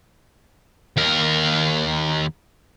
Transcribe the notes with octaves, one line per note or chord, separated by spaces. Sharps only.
D#2 A#4